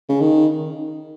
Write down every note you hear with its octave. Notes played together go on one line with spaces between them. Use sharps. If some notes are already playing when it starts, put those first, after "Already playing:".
C#3
D#3